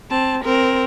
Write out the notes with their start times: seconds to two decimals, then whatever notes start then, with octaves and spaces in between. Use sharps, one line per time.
0.10 C4 A5
0.44 C4 A#4